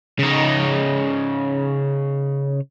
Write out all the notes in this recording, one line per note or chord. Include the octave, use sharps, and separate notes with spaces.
C#3 D#4